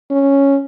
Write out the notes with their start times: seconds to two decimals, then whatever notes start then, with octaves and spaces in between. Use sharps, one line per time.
0.11 C#4